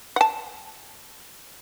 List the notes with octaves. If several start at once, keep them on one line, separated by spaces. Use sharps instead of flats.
F#5 A5